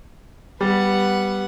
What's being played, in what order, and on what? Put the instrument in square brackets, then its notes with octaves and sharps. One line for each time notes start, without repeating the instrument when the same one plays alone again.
[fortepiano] G3 [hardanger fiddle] B3 F#5